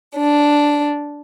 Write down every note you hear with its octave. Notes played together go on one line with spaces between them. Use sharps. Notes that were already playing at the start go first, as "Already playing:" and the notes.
D4